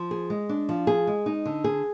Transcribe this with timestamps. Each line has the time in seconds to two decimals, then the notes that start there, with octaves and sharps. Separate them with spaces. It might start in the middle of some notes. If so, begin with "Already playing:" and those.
Already playing: F3
0.11 G#4
0.30 G#3
0.49 D4
0.69 F3
0.87 G#4
1.07 G#3
1.26 D#4
1.46 D3
1.64 G#4